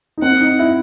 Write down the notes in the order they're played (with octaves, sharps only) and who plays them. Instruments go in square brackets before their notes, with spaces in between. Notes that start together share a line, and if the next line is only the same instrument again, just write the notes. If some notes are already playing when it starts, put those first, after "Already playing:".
[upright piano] D#4
[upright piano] C4 [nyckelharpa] F#5
[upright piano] D#4
E4